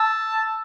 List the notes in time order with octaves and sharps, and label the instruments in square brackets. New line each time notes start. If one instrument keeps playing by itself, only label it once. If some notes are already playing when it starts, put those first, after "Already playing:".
Already playing: [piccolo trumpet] A5 [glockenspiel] E6